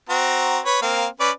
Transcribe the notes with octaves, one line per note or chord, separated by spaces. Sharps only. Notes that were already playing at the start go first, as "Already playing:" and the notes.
C4 F#4 A#5
B4 C#5
A#3 C4 F5
C#4 B4 D5